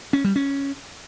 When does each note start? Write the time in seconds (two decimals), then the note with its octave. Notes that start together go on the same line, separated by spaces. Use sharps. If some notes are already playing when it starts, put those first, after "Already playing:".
0.13 C#4
0.24 G3
0.36 C#4